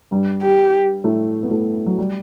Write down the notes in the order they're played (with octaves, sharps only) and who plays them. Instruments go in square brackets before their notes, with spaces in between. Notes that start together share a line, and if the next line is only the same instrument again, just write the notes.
[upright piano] G2 G3
[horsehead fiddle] G4
[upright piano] A2 A3
B3
A2 A3
F#3
G3